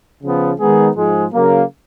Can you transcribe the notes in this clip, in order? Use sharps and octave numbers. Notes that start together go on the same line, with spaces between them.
C#3 F3 B3
D#3 G#3 B3 D#4 G#4
G#2 F3 G#3
C#3 F#3 A#3